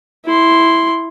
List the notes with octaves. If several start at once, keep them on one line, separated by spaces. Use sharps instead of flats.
E4 C6